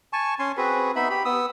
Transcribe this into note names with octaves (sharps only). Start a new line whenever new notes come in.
G#5 A5 C#6
C#4 G#5 C6
C4 F#4 G#4 B4
B3 D#4 E5 B5
G4 B5
B3 D#6 E6